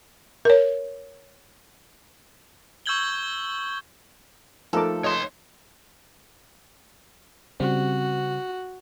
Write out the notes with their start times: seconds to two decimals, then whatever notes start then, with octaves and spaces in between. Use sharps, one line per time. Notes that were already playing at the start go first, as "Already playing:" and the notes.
0.45 A#4 C#5
2.86 C#6 E6 G6 G#6 F#7 G7
4.73 F3 A3 D#4 A4 A#4 D6
5.04 C#5 D#5 C6
7.60 C#3 G3 C4 F#4